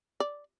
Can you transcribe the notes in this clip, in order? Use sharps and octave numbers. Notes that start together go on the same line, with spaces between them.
D5